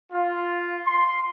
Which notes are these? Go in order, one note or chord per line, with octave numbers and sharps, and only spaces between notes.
F4
C6